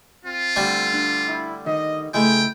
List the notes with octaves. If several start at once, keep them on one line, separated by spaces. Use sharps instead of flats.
C4 F4
D3 G3 A3
D4
E4
D#3 D#5
C#2 G#3 A3 E4 G5